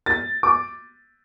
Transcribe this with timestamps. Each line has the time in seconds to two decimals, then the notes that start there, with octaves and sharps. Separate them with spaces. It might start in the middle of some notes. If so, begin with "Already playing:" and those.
0.06 A6
0.43 D6